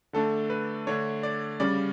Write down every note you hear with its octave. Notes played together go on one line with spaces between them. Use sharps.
D3 A3 D4 A4
B4
D3 A3 D4 C#5
D5
C#3 G3 C#4 D5